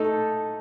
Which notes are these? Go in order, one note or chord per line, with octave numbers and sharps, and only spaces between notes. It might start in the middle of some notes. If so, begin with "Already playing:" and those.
Already playing: A3 D#4 A4